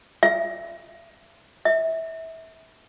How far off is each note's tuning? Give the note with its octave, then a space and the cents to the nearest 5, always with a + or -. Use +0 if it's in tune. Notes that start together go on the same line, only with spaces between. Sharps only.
E5 +30
E5 -25